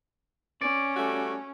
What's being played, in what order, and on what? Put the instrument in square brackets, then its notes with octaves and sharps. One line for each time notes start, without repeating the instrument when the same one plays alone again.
[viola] C#4 [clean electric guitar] D5
[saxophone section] G3 A3 F#4